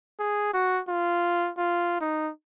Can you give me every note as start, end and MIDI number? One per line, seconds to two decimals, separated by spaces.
0.20 0.51 68
0.54 0.81 66
0.88 1.50 65
1.58 1.96 65
2.01 2.31 63